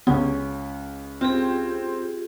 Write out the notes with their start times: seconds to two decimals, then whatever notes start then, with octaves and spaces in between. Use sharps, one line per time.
0.07 C#2 B3 C#4
1.21 C4 F4 G4 G#4